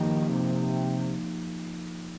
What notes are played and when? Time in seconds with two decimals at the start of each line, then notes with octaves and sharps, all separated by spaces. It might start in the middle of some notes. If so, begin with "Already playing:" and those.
Already playing: D#3 F3 A#3 D#4 G4
0.30 C3